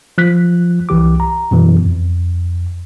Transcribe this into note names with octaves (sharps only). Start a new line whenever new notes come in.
F3 F#6 B6
C2 E3 G4 D6
A#5
F#2 B2 E3
F2